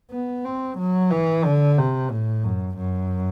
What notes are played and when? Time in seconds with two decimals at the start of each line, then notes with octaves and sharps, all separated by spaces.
0.11 B3
0.44 C4
0.78 F#3
1.11 E3
1.44 D3
1.78 C3
2.10 A2
2.44 F#2
2.77 F#2